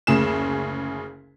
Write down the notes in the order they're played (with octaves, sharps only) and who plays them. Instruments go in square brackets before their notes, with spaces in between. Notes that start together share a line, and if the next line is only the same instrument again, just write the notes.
[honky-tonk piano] F#1 D2 C#3 G#4 E7